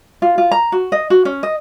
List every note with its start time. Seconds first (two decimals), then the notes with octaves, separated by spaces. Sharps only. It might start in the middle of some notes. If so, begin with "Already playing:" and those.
0.22 F4
0.38 F4
0.51 A#5
0.72 F#4
0.92 D#5
1.10 F#4
1.25 C#4
1.43 D#5